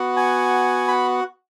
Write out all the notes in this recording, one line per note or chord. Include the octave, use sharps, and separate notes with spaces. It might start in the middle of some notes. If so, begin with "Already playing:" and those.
Already playing: B3 F#4
G#5
B5